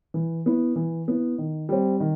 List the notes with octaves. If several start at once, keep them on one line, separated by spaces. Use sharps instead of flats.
E3
B3 E4
E3
B3 E4
D#3
G3 C4
D#3